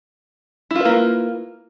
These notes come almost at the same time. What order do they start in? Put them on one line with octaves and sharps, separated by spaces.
E4 F4 B4 A#3